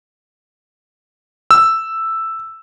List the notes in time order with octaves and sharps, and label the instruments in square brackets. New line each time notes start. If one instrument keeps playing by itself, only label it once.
[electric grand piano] E6